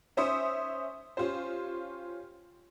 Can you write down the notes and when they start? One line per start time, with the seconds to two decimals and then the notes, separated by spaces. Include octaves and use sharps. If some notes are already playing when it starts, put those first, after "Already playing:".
0.17 C#4 C5 E5 D#6 C#7
1.17 C#4 F4 G4 C5